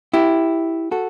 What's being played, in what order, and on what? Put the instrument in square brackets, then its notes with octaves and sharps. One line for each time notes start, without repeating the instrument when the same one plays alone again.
[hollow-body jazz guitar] E4 G4
F#4 A4